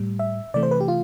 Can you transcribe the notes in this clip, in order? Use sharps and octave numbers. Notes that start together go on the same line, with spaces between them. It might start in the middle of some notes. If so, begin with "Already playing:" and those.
Already playing: A2 G3
E5
C3 E3 A3 D5
C5
B4
G4
F4